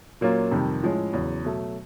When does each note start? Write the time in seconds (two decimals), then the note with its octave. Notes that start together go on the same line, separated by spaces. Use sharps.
0.21 A#2 F#3 A#3 C#4 F4
0.51 F2 C3 D#3 G3
0.83 A2 F3 G#3 C#4
1.13 E2 C#3 F#3
1.44 B2 F#3 A3